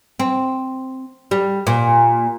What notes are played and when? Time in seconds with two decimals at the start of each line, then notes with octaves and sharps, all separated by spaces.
0.20 C4
1.31 G3
1.67 A#2